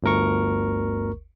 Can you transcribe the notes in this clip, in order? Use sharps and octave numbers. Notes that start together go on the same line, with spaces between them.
G1 D2 A#4 C#6